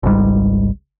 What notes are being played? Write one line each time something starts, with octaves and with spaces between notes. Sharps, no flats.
G#1 C#2 G#2 G3